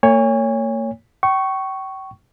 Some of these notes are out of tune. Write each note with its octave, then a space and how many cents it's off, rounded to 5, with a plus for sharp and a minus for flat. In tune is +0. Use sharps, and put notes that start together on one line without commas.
A#3 -40 C#5 +10 G#5 -35
G5 -35 C#6 +0